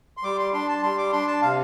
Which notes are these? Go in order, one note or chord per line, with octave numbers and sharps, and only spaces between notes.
C6
G3 D6
C6
D4 C6
A5
G3 C6
D6
D4 C6
A5
C3 F5